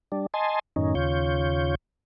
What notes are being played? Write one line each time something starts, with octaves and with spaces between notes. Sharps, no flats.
G3 D4
D#5 G#5 A5 C6
F#2 A2 D#3 C#4 D#4
D#2 C#3 F4 C#5 G6